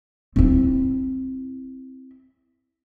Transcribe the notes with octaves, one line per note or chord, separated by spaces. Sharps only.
C4 E4